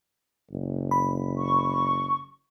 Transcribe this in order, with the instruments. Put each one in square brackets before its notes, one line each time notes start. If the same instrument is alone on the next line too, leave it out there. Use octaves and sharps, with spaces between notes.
[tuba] F#1
[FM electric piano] B5
[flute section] C#6